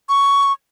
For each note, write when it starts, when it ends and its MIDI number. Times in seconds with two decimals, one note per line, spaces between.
0.09 0.52 85